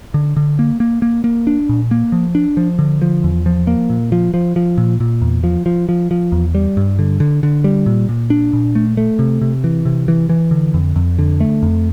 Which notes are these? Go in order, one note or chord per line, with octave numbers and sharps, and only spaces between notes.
D3
D3
A#3
A#3
A#3
A#3
D4
A#2
A#3
F3
D4
F3
D3
F3
E2
F3
A#3
A#2
F3
F3
F3
A#2
A#2
E2
F3
F3
F3
F3
E2
G3
G2
D3
D3
D3
G3
A#2
A#2
D4
A#2
A3
A3
C3
C3
E3
C3
E3
E3
D3
F2
F2
D3
A3
F2